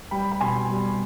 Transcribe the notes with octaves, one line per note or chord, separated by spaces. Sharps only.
G3 G5 B5
B5
B2 G#5 C6
G3